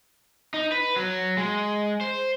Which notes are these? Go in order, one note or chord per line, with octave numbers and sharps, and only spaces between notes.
D#4
B4
F#3
G#3
C5